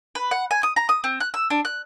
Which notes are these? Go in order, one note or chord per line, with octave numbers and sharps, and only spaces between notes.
B4
F#5
G#5
D#6
A#5
D#6
C4
F#6
E6
D4
F#6